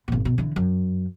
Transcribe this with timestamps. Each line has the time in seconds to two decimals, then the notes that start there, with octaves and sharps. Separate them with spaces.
0.08 G#1 A#2
0.25 B2
0.38 D3 E3
0.56 F#2